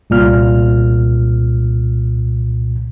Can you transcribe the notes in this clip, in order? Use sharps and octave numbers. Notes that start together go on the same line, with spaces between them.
C2 A#2 F6